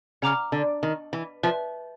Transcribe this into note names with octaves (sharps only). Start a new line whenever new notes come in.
C#3 F#5 A#5 D6 F6
D3
D#3
E3
F3 B4 E5